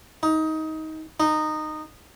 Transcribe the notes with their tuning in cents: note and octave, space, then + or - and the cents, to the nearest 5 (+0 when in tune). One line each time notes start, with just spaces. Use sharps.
D#4 +20
D#4 -15